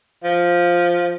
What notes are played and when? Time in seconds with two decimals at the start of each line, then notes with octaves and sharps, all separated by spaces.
0.24 F3